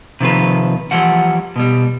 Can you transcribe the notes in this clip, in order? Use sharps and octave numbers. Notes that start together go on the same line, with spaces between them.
C3 D#3 F3 B4
E3 F3 G3 F#5
B2 G3